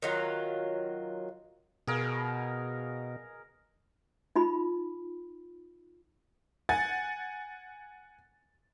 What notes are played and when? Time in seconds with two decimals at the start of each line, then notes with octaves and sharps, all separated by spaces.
0.02 D#3 F#3 F4
1.87 B2 G#4 A#4 F5
4.36 D#4 F4 B5
6.69 F#5 G#5 A6